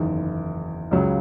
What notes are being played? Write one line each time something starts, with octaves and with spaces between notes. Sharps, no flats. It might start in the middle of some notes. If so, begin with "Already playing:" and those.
Already playing: F#1 E2 D#3
C#2 C#3 F#3